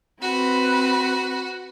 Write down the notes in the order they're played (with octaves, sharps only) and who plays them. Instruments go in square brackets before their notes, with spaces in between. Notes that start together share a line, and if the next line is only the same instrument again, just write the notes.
[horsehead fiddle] C4 B4 [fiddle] F#4